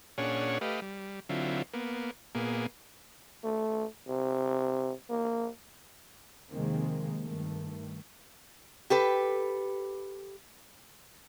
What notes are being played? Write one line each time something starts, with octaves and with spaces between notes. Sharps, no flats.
A#2 C#4 D4 G#4 C#5 F#5
A3 G4 B4 D#5 F5
G3
D3 F#3 C4 E4 F4
A#3 B3
A#2 A#3 B3 G#4
A3
C3
A#3
F2 C3 D#3 G#3 A#3 C4
G2 D#3 A3
G4 A4 B4